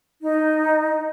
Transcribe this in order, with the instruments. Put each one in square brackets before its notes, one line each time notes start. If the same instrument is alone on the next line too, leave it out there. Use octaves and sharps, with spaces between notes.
[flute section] D#4